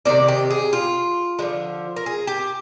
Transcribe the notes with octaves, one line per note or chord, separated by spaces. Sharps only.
C3 D#3 A#3 D#4 D5
G4
G#4
F4
D3 F3 G#3
A#4
G#4
G4